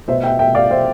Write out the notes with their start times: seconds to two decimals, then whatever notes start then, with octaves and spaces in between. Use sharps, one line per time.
0.08 B2 C5 E5
0.24 E5 G5
0.39 E5 G5
0.55 D5 F5
0.71 C5 E5